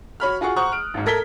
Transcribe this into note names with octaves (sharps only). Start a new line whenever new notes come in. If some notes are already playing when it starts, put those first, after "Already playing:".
F#4 C#5 B5 F6
F4 F#4 G#4 F#5 C#6
C5 F#5 A#5 C#6 D#6 F#6
F6 D7
G#1 G#2
A3 A4 A#4 G#6 B6 G7